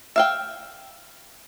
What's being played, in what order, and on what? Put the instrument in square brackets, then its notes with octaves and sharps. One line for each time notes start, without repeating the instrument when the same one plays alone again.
[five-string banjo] E5 F5 G5